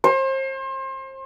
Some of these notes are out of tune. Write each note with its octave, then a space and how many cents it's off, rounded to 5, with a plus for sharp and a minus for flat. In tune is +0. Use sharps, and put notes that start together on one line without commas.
C5 +35